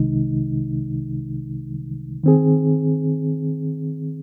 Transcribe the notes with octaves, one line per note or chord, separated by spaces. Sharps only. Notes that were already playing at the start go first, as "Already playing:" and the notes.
Already playing: C2 C3 D#3 G#3 D#4
D#3 C4 G#4